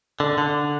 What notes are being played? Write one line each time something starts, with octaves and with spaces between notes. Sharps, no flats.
D3
D3